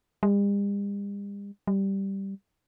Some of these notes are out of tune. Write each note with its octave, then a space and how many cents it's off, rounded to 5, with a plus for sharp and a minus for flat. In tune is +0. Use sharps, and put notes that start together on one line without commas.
G3 +45
G3 -5